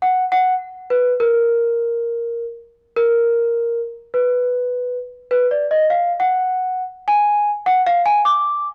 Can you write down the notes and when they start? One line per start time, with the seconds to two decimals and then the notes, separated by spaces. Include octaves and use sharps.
0.02 F#5
0.32 F#5
0.90 B4
1.20 A#4
2.97 A#4
4.14 B4
5.31 B4
5.51 D5
5.71 D#5
5.90 F5
6.20 F#5
7.08 G#5
7.66 F#5
7.86 F5
8.06 G#5
8.25 D6